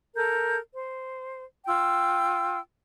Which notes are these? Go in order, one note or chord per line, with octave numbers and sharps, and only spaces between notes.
A4 A#4 G6
C5
F4 G5 E6